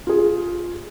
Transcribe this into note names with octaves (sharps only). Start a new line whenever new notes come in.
F4 G#4